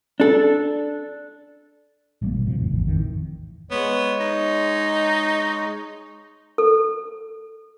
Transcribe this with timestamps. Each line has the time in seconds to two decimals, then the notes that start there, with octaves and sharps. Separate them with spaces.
0.20 D4 A4
2.22 A1 G3 A3 A#3
2.33 G2 B2
2.46 C3 F3
2.58 D#2 A2 C3
2.70 A1 E2 G#2
2.87 F2 D#3 E3
3.71 G#3 B3 C#5
4.20 D#4
6.58 A4